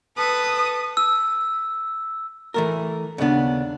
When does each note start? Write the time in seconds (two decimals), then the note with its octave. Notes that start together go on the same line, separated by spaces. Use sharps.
0.17 A4 B4 D#6
0.97 E6
2.54 E3 A3 A#4
3.18 D#2 C#3 B3 D4